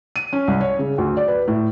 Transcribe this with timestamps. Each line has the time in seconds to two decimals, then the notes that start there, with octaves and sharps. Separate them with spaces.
0.16 D#7
0.33 C#4
0.48 C2
0.61 C#5
0.79 C#3
0.98 D2
1.17 D5
1.28 B4
1.48 A2